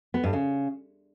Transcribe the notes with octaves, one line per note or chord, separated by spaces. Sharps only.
B3
G2
C#3